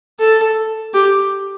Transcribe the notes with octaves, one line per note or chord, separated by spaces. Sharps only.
A4
G4